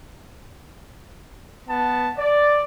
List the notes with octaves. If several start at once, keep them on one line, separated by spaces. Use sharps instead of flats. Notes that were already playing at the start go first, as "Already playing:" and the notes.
B3 A5
D5